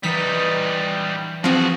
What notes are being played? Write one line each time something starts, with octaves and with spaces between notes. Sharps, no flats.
E3 G3 D#4 B6
F3 C4 F#4 G#4